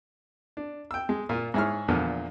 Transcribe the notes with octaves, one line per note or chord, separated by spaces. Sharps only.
D4
G5 E6
G#3
A#2 F4
G#2 E4 G#4 C#5 F6
E2 A#2 D3 F3